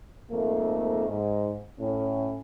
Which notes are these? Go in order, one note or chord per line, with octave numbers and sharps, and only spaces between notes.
F2 G#2 A3 A#3
G#2
A2 C#4